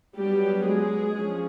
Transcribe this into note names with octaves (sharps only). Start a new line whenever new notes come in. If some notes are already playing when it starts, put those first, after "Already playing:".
F#3 G3 B3 D4 G4
G#3 G#4
F3 G#3 C#4